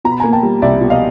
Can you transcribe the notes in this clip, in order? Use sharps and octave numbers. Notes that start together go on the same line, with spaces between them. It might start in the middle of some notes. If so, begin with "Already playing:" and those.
B2 A#5
B5
A#3 G#5 A#5
G5 A5
G3
C2 D5 E5
B2
D#5 F5